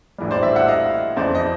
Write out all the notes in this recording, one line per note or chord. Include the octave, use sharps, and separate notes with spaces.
A#1 A2 E3 G3
C5 D5
D5 E5
E5 F#5
D#5 F5
F2 C#3 E3 C5 D5
D#5